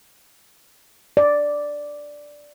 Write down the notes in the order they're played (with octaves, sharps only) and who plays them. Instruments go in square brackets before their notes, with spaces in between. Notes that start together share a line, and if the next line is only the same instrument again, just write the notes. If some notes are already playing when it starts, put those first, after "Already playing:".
[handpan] D5